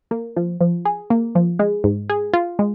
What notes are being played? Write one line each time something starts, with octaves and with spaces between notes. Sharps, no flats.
A#3
F3
F3
G#4
A#3
F3
G#3
G#2
G#4
F4
G#3